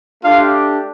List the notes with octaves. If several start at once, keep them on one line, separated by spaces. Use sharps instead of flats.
A3 D4 F4 G4 F5